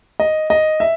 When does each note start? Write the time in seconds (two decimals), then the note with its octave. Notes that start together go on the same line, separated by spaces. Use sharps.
0.20 D#5
0.50 D#5
0.80 E5